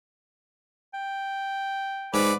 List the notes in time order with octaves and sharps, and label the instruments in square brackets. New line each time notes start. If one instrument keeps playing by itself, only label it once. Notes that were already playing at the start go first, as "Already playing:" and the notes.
[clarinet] G5
[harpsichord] G#2 [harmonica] B4 D5